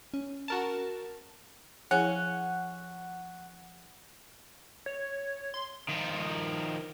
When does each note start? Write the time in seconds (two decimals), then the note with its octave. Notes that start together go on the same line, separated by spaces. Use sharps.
0.14 C#4
0.48 F#4 A#4 A5
1.91 F3 C#4 E4 G#4 F#5
4.86 C#5
5.54 C6
5.89 D#3 F3